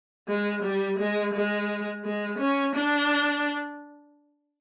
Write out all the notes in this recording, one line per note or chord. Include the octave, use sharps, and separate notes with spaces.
G#3
G3
G#3
G#3
G#3
C#4
D4